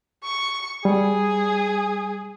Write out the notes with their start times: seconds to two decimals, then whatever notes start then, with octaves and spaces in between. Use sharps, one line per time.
0.24 C#6
0.85 G3 G#4